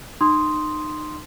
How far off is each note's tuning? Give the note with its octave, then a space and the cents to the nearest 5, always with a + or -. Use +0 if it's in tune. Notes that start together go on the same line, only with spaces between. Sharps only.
D#4 -30 C6 +0 D#6 +0